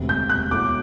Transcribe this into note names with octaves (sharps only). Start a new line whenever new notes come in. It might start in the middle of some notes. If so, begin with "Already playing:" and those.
Already playing: E1 D2 C3
G6
F#6
B2 F#3 A3 E4 D6